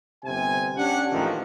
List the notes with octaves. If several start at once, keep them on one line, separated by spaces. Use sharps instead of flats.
G1 C3 G#5
C#4 D4 G4 F#5
A1 D#3 F3 A3 A#3